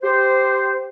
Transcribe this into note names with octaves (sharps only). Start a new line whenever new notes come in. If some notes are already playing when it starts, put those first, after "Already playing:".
G4 C5